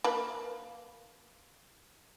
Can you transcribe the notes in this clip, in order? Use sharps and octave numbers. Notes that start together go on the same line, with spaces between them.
A#3 B4